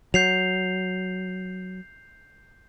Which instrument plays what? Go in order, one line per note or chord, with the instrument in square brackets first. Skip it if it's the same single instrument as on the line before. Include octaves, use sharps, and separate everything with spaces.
[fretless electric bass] F#3 [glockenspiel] G6 C7 F7